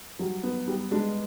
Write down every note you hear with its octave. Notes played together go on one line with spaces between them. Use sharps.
F#3 G3
B3
G3
G#3 D4